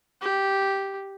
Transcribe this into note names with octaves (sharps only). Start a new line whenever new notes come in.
G4